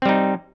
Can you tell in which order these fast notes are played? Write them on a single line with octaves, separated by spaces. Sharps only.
C4 G3 D#4